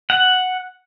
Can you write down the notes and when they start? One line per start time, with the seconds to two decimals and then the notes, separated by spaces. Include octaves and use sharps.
0.10 F#5